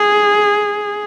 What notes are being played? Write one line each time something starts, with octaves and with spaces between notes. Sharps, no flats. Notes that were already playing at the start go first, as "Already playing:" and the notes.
Already playing: G#4